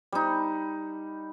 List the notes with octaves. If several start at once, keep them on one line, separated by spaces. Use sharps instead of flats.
G3 D#4